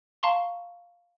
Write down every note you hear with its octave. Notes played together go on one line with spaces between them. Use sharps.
F5 A5 A#5 C6 C#6